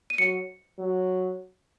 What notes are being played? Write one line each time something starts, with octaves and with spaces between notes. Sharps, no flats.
D#7
F#3 C#7
F#3